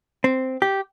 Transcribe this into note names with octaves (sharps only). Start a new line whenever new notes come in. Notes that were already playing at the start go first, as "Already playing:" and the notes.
C4
G4